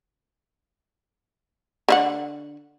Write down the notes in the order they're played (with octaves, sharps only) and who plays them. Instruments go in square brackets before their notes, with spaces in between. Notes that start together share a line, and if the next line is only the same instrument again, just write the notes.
[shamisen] D3 E4 F#5